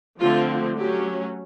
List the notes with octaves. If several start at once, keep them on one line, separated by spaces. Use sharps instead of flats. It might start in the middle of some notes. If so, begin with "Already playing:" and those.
D3 F3 A3 C4 F4
F#3 A3 C#4 G4